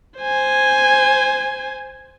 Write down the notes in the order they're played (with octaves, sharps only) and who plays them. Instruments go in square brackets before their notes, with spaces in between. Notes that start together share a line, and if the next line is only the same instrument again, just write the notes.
[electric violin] C5 G#5